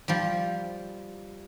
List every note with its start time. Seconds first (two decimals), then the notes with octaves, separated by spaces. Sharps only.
0.08 F3 G3